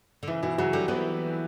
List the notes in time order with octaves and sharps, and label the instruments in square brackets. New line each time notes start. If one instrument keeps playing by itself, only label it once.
[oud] D3
[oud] C#3 [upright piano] E3 E4
[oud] B2 [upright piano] E3 E4
[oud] C#3 [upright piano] F#3 F#4
[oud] D3 [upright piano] G3 G4
[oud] E3 [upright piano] B3 B4